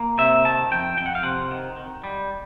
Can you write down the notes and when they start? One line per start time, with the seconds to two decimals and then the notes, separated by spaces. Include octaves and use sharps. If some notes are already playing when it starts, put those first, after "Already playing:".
Already playing: A#3
0.18 C3 E5
0.45 D#3 A5
0.72 F2 G5
0.97 F2 G5
1.06 F#5
1.15 F5
1.23 C3 F#5
1.51 D#3
1.77 D#3
2.04 G3